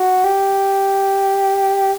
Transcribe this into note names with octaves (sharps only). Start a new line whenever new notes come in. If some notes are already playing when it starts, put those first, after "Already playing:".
Already playing: F#4
G4